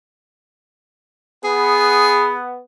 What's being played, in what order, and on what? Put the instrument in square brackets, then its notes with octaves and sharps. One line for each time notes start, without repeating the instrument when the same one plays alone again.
[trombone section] B3 [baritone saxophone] G#4